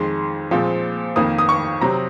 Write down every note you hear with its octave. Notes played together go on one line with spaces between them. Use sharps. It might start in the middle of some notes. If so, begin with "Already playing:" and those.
Already playing: F2 D#3 G#3 C6
A#2 F3 G#3 C4
F2 D#3 A#3 D#6
D#6
C#6
C3 F#3 C4 A#5